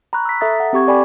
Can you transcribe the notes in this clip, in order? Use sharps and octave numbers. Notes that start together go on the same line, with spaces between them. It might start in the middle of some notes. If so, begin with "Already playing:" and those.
A#5 B5 C#6 F#6
E6 B6
A4 E5 A#5 D#6 A6
F#5
C4 G4 C#6 G#6
A4 D5 G5 G#5 B5 D6